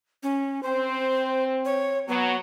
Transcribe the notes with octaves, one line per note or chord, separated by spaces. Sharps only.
C#4
C4 C5
C#5
F#3 B3